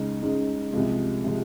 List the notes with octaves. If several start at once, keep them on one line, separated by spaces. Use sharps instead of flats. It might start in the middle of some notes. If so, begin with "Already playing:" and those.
Already playing: C#2 C#3 G#3 D#4
C#2 C#3 G#3 D#4
C2 C3 F3 G#3
C3 F3 G#3